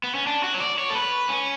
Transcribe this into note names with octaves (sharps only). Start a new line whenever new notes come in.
B3
C#4
D4
F#4
C#5
D5
C#5
A4
B4
C#4